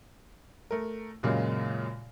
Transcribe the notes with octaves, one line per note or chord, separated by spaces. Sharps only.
A3 A#4
F#2 A#2 C#3 G#3 A#3 F4